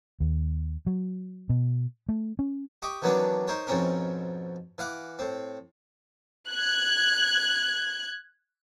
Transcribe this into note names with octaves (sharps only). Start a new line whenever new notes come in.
D#2
F#3
B2
A3
C#4
G4 D#5 C#6 D6
D#3 E3 F#3 B3 C#4 D4
D#4 A#4 C5 C#5
F2 G#2 B2 C4 C#4 A#4
E3 F5 F#5 D6
A2 C4
F#6 G#6